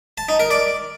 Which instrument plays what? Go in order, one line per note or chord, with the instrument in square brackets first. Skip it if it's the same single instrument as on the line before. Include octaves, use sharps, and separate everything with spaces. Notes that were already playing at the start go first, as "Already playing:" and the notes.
[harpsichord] A5
D#4
A#4
D5